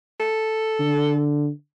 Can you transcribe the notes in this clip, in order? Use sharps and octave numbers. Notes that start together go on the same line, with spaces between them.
A4
D3